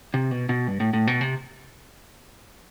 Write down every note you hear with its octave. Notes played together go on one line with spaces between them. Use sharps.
C3
B2
B2
G2
A2
A2
B2
C3